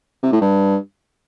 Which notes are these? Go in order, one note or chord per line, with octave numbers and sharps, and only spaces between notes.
C3
A2
G2